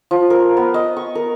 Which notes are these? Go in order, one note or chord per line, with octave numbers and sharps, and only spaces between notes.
F3
A#4
B3
D#5
C#6
A#4